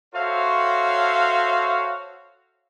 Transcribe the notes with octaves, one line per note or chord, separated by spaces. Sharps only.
F#4 A4 C5 C#5 E5 F5